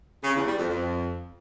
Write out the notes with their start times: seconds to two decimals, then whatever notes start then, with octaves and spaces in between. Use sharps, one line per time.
0.23 C#3
0.35 E2
0.46 G3
0.58 F2
0.69 F2